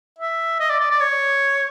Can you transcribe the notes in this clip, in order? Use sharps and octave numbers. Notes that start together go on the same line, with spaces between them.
E5
D#5
D5
D5
D5
C#5